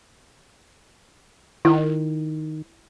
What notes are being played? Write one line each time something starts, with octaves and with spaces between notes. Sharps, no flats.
D#3 E4